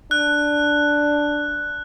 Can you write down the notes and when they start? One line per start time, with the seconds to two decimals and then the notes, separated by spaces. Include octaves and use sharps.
0.11 D4 F#6